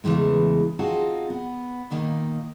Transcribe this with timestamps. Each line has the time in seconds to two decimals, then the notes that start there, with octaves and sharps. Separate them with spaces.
0.04 E2 C#3 E3 G#3 A3
0.79 C4 D#4 F4 F#4 G#4 A5
1.30 B3
1.91 A#2 D#3 A#3 D#4